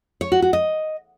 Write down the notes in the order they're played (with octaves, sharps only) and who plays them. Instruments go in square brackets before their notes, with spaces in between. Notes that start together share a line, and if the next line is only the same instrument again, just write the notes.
[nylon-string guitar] C#5
F#4
F#4
D#5